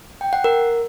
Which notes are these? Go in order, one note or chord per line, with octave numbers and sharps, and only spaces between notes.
G5
F#5
A#4